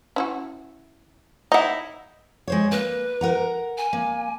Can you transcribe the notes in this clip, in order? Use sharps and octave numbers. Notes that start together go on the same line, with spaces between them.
C#4 E4 F#4
D#4 E4 D#5 F#5
G#3 C5 C#5
A#3 B4
A#4 F#5 A#5
G#5
A#3